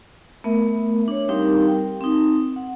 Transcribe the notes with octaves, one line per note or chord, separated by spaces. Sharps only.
A3 B3 A#4 E5
D4 C#5
G3 C4 D#4 G4 A#4 F5
A#4 G5
C4 D#4
F#5